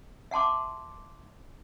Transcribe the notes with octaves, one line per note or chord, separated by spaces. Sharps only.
E5 F#5 A5 C6 D6